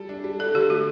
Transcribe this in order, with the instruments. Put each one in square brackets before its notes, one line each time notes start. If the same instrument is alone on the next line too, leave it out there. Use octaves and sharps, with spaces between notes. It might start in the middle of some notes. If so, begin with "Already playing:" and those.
Already playing: [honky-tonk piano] G3 A4
D4
G3
[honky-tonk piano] D4 [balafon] A4
[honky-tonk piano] D3 [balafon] G4
[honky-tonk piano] A3 [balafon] F#4